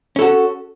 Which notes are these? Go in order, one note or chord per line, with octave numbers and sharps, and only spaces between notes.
C#4 F#4 A4